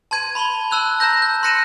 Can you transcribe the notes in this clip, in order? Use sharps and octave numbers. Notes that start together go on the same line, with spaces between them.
A5 C6 G#6 D#7
B5 C6 F7 G7
A5 C6 E6 F#6 G#6
A#5 E6 G6 A#6
G6
C6 F#6 A#6 C#7 D#7 E7